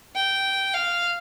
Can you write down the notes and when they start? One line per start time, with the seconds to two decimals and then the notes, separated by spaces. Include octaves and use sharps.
0.16 G5
0.74 F5